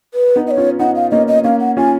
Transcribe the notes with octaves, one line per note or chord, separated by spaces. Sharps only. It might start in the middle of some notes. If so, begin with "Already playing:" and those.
B4
B3 D#4
D#5
C#5
C#4 F4
B3 D#4 F#5
F5
A#3 C#4 D#5
D#5
A#3 C#4 F5
F#5
C#4 F4 G#5